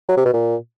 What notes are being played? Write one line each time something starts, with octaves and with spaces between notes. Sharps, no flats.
F#3
C3
B2
A#2